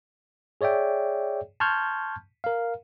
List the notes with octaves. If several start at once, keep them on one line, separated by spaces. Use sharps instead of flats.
G#4 C#5 D5 E5 G5
A5 C6 C#6 F6 G6 G#6
A#4 F5